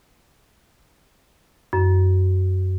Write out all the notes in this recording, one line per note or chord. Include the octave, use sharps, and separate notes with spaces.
F#2